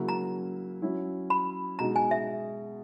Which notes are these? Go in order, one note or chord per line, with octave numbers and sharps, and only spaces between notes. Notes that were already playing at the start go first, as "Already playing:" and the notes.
Already playing: C#3 F#3 A#3 E4
A#5
F#3 C#4 E4
B5
B2 G#3 D#4 A#5
G#5
E5